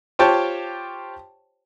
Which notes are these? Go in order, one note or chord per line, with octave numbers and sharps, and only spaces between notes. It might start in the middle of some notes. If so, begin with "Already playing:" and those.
F4 G4 C5 C#5 G5 A5